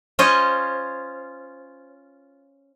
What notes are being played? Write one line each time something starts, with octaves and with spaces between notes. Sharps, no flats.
C#4 F4 C5 C#5 D#5